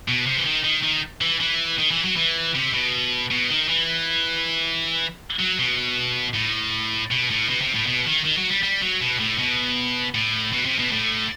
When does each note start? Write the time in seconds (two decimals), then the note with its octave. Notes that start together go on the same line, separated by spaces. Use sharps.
0.08 B2
0.27 C3
0.38 E3
0.46 D#3
0.64 D#3
0.83 D#3
1.21 E3
1.41 E3
1.78 D#3
1.91 E3
2.05 F#3
2.16 E3
2.55 C3
2.74 B2
3.31 B2
3.50 D#3
3.69 E3
5.39 F#3
5.59 B2
6.35 A2
7.11 B2
7.30 A2
7.49 B2
7.61 C3
7.74 A2
7.86 B2
8.06 D#3
8.25 D#3
8.37 F#3
8.50 G3
8.63 G3
8.82 F#3
9.01 B2
9.20 A2
9.39 B2
10.15 A2
10.53 B2
10.66 C3
10.78 B2
10.92 A2